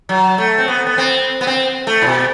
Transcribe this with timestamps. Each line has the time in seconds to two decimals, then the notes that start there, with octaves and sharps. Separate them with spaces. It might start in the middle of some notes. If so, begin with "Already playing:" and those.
0.09 F#3
0.38 A3
0.58 C4
0.68 B3
0.87 B3
0.98 C4
1.41 B3
1.47 C4
1.87 A3
2.02 A2
2.07 B2